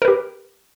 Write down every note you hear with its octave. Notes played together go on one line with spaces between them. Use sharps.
G4 A#4 B4